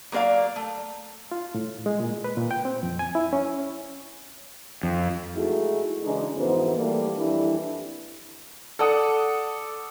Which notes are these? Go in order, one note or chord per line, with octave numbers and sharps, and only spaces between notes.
F#3 A#3 A#4 D5 F5
A3
F4
A2
G#3
A#2
B4
A#2
G5
C4
F2
G#5
E4
C#4
F2
G#3 A3 D#4 E4 F#4 G#4
C#3 E3 G#3 D4 D#4
F2 G#2 E3 B3 F#4 C5
E3 G3 A3 A#3
F2 E3 G3 D4 E4
A4 D5 F#5 D#6